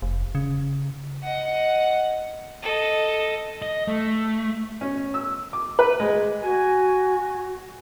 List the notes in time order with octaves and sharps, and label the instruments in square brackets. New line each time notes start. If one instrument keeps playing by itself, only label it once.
[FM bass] F1
C#3
[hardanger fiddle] D#5 F#5
[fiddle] A4 D#5
[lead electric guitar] D#5
A3
[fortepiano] C#4
E6
D6
B4
G#3
[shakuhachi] F#4 [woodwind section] G#5